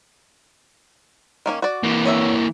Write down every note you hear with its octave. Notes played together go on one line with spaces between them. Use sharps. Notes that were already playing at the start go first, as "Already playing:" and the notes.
D#3 A#3 C#4
F#4 D5
E3 A#3
C#4 C#5 E5